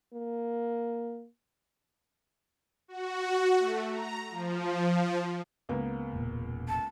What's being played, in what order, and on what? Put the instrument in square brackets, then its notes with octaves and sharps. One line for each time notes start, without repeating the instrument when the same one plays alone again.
[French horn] A#3
[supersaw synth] F#4
A3
A#5
F3
[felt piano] C#2 A#3 B3
[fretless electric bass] E1 A#2
[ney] A5